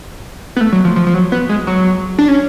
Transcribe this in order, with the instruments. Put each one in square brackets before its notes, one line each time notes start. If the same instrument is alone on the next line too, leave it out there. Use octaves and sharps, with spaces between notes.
[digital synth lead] B3
A3
F#3
F3
F3
F3
F#3
B3
G#3
F#3
D4
C#4